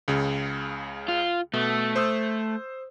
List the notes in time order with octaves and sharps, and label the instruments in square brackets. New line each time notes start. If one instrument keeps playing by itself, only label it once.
[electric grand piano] C#2 C#3
[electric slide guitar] F4
[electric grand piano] B2 [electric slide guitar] A3
[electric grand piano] C5 D#6 E6